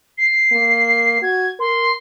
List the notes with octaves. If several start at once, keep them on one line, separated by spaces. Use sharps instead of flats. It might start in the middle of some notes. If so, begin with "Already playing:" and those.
C7
A#3
F#4 G#6
A#4 C6